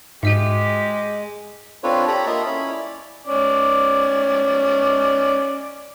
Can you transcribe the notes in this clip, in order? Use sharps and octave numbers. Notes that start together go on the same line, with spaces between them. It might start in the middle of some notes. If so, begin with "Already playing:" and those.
G#2 G#3 F#4 G4 D#5 E5
C4 D4 F4 A4 B4 C#5
G4 A4 C#5 D5 A#5 B5
A#3 F4 A4 D#5 E5 D#6
C#4 E4 C#5 B5
D5
C#4 D5